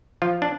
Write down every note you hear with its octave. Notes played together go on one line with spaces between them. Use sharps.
F3 F4
D4